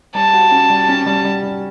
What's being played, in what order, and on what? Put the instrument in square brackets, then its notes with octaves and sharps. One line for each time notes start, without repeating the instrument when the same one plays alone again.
[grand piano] G3 [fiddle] A5
[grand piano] F#4
C#4
G3
C#4
G3
G3
G3